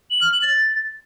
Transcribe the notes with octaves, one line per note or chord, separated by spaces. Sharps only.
F#7
F6
F#7
A6